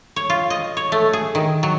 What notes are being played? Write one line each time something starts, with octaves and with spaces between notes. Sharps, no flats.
C#5
F4
D#5
C#5
A3
G#4
D#3
F#3